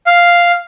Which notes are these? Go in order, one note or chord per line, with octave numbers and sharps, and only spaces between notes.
F5